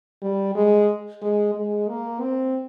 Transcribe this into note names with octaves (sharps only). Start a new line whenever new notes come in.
G3
G#3
G#3
G#3
A#3
C4